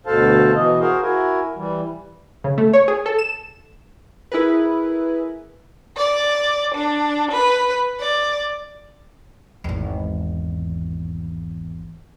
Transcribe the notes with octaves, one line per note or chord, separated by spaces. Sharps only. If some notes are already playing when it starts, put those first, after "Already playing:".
D2 B2 A4 C5 F5 A5
B2 E3 D#5
F#4 G#4 A#4 C5 F5
E4 F#4 A#4 G#5
E3 G3
C#3
A3
C#5
G#4
A4
E7
E4 G#4 A#4 B4
D5
D4
B4
D5
G#1 E2